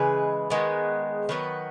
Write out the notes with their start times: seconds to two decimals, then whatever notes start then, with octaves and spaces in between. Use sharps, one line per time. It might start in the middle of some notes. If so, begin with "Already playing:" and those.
Already playing: C#3 E3 G#3 B4
0.50 D#3 G#3 B3
1.29 D#3 F#3 B3 B4